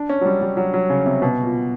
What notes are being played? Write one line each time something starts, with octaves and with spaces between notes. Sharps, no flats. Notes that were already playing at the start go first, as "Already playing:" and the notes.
Already playing: D4
C#4
F#3
G3
G3
F#3
F#3
C#3
C3
B2
A#2